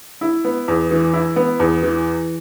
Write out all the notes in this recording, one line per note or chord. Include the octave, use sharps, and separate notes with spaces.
E4
B3
E2
E3
E4
B3
E2
E3